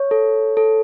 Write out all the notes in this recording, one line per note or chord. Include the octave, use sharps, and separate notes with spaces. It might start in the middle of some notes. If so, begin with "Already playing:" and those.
Already playing: C#5
A4
A4